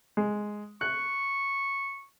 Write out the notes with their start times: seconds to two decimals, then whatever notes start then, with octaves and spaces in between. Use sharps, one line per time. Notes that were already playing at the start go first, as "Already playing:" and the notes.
0.17 G#3
0.81 C#6 F#6